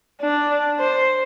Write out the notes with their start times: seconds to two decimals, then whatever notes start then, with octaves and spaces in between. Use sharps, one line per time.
0.21 D4
0.79 C5